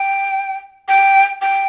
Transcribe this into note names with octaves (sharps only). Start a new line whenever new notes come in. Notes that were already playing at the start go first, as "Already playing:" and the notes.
Already playing: G5
G5
G5